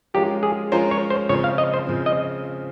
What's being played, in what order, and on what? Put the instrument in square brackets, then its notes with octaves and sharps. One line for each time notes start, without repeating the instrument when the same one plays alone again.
[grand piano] F3 G#3 C#4 F4 A#4 [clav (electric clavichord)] G4
[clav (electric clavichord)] G#4
[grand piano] F3 G#3 C#4 F4 A#4 [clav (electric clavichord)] C5
[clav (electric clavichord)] C#5
C5
[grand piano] C#3 F3 C4 [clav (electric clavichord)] C#5
[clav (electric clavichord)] F5
D#5
C5
[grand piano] C#3 F3 C4
[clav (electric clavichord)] D#5